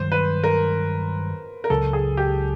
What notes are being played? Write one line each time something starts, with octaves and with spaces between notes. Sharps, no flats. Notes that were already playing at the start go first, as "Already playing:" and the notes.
Already playing: G2 D#3 F#3 C5
B4
A#4
A#4
C#2 C#3 F#3 A4
G#4
G4